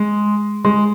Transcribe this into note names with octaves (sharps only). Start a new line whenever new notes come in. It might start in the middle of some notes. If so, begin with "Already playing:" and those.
Already playing: G#3
G#3